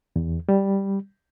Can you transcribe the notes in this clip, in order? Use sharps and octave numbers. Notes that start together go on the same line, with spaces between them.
E2
G3